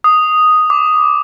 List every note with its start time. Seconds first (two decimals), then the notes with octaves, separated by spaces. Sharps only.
0.04 D#6
0.70 D6